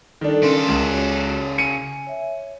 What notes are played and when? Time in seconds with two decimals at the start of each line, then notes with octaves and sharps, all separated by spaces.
0.21 D#3 G3 D4 A4
0.43 C#3 C#4 A4 A#4 C6
0.69 C#2
0.91 F#4 C#5
1.58 G#5 C#7 D#7
2.07 C#5 E5